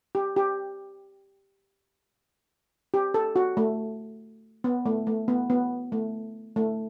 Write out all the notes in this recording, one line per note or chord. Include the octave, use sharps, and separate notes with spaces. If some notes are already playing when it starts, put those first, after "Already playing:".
G4
G4
G4
A4
F#4
A3
B3
A3
A3
B3
B3
A3
A3